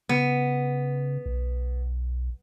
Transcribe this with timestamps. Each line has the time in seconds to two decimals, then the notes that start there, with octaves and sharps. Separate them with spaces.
0.09 C#3 B3
1.26 B1